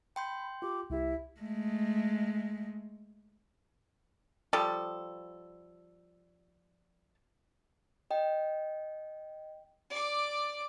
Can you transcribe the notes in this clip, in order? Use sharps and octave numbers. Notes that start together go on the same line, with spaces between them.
G5 B5 C6 G6
F4 G4 D6
C2 E4 G4
G#3 A3
F3 G3 A4
D#5 G5
D5 D6